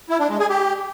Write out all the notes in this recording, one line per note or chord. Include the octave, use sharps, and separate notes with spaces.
E4
D4
G#3
G#4
G4